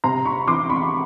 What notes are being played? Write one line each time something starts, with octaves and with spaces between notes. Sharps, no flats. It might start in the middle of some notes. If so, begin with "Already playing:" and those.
C3 A#5 C6
B5 C#6
E3 C6 D6
B5 C#6